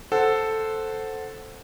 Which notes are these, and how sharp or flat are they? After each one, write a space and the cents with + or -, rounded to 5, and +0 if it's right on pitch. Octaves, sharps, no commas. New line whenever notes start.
A4 +0 C5 +0 F#5 +0